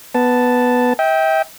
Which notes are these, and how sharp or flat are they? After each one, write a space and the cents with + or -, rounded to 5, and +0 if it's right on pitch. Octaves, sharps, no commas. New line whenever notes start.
B3 +0 A5 +0
E5 -40 G5 +0